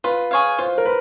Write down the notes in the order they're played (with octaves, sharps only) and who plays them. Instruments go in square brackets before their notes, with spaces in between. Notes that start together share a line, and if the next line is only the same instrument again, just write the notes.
[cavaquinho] F4 [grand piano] B4
[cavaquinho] G#4 C#5 F5
[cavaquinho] F4 [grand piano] C5
[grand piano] A#4
B4